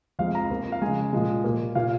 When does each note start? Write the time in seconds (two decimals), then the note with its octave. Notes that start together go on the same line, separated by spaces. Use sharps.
0.19 F2 F3 G#3 F5
0.35 A#5
0.50 F2 F3 A#3
0.72 F5
0.82 C#3 G#3 G#5
1.13 A#2 F3 G#3
1.44 A#2 A#3
1.75 A#2 A#3 F5